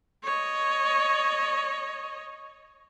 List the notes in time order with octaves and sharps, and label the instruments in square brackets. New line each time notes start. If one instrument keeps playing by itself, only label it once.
[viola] C#5 D#5